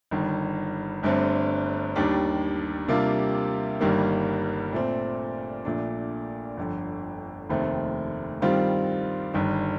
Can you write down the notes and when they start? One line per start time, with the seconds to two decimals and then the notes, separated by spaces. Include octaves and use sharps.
0.11 G1 G2 D#3
1.03 G1 G2 D3 A3 C4
1.96 D#2 D#3 G3 D4
2.88 C3 G3 A#3 D4 F4
3.81 G1 G2 D#3 G3 A#3
4.73 A#2 A3 C4
5.65 A#1 A#2 A3 D4
6.57 G1 F2 D3
7.49 F1 D#2 D#3 A3 C4
8.42 G2 D#3 G3 C4 F4
9.34 G1 G2 D#3